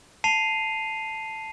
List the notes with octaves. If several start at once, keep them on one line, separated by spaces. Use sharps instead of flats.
A5 C7 D#7 F7